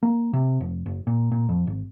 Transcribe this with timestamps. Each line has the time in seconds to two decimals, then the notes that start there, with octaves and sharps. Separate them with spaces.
0.03 A#3
0.33 C3
0.60 F1
0.86 F#1
1.07 A#2
1.32 A#2
1.49 F2
1.67 G#1